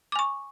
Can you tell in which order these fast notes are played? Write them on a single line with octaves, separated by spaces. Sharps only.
D6 G#5 C#6